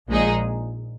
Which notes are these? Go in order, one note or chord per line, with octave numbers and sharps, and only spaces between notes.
A#1 A#2 G#3 D#4 G#4